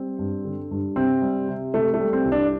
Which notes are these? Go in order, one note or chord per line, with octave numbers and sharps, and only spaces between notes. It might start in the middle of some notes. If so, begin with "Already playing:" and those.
Already playing: G3 C4
G2
D3
G2
C3 C4
G3
C3
C3 A3
A3
G3
C4
C2
D4